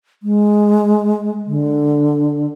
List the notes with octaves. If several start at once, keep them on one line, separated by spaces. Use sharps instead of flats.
G#3
D3